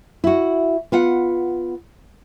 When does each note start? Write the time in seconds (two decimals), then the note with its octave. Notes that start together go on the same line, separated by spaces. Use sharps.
0.24 E4 F#4
0.92 B3 F4 F#5